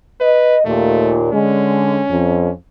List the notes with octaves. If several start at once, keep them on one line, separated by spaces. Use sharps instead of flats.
B4 D#5
D#2 A#2 A3
D3 G#3 C#4
F2